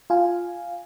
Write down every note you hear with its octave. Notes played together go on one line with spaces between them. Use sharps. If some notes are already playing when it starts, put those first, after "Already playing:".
F4 F5 G#5